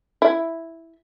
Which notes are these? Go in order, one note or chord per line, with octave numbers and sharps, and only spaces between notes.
E4